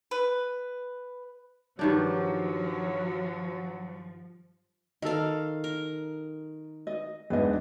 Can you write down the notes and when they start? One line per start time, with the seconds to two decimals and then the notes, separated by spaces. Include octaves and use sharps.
0.11 B4
1.79 G2 D#3 F3 F#3 D4
5.02 D#3 A4 D#5 F5
5.64 A#4
6.87 D#5
7.30 E2 G#2 D4 B4 D#5